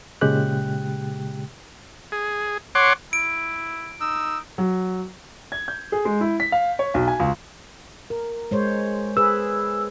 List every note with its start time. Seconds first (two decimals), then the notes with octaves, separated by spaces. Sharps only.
0.21 A#2 C#3 G#3 G4 G5 F#6
2.12 G#4
2.75 C#5 F#5 C6 D6
3.13 E4 D7
4.01 D#4 E6
4.58 F#3
5.52 G#6
5.68 G6
5.92 G#4
6.05 G#3
6.21 E4
6.40 B6
6.52 F5
6.79 C#5
6.94 B1
7.08 G#5
7.19 C#2
8.10 A#4
8.51 G#3 C5 C#5
9.17 G#4 B4 E6